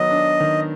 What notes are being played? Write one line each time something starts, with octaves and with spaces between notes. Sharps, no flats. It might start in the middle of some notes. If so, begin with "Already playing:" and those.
Already playing: D#3 F#3 B3 D#5
D4
D#3